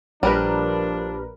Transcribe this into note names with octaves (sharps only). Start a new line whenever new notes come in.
A#1 F3 G3 D4 A#4 B4